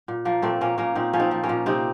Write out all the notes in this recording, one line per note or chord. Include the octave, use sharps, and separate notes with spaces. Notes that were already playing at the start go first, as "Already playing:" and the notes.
A#2
F3 A#3
A#2 A3 C4
A#2 A#3 C#4
A#2 A#3 C#4
A#2 C4 D#4
F3 C#4
C4 D#4
F3
A#3 C#4
A#2
C3 C4 D#4